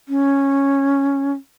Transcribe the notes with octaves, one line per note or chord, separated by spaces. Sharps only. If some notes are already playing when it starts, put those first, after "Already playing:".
C#4